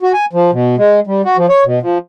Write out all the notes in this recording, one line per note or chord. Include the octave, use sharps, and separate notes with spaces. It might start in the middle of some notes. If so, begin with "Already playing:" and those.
F#4
G#5
F3
B2
G#3
G3
F#4
F3
C#5
B2
F3